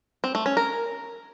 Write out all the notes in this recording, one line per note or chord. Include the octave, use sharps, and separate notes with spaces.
C4
A3
C#4
A#4